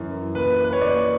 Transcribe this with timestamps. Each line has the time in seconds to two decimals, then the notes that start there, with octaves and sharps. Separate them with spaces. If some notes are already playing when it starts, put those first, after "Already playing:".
Already playing: F#2 E3
0.35 A#2 B4
0.64 B4
0.73 C#5
0.81 A#2 D5